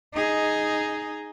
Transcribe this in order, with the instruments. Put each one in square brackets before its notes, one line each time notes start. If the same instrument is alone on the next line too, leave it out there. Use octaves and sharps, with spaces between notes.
[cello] D#4 G#4